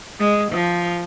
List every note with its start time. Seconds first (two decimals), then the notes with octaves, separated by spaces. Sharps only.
0.20 G#3
0.52 F3